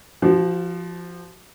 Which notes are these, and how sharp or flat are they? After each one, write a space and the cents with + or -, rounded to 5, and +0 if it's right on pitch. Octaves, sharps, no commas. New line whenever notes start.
F3 -10 F#4 +35